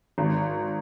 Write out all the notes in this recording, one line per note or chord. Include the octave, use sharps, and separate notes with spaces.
G#1